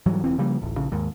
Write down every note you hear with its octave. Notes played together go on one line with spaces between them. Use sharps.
G#2 E3 F#3 G3
E1 C#2 E3 C4
C#3 F3 G3 A#3
D1 A1
A#1 C#3
D#2 G#2